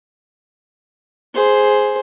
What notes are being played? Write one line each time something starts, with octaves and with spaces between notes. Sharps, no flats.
G#4 C5